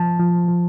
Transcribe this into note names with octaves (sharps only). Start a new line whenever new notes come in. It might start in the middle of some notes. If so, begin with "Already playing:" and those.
Already playing: F3 A5
F3
F3